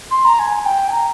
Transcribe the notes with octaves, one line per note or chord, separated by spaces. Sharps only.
C6
A#5
G#5
G5
G#5
A#5